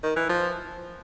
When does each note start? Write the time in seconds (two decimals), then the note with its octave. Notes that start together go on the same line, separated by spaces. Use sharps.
0.03 D#3
0.16 E3
0.29 F3